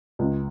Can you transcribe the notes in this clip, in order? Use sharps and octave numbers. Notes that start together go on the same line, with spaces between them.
C#2